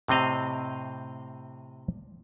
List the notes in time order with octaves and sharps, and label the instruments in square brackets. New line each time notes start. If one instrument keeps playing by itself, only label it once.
[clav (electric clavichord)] A2 C3 C4 D#5 F5